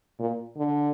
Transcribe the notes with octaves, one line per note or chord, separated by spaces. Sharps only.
A#2
D3